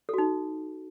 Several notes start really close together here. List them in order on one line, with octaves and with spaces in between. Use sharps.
A4 F#4 D#4